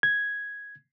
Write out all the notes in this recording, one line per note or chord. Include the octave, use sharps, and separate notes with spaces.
G#6